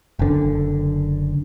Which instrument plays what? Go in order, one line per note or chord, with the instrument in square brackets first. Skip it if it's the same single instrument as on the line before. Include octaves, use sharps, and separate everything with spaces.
[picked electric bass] F#1 D3